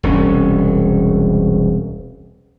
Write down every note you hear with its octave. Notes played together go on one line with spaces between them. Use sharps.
E1 C2 C#4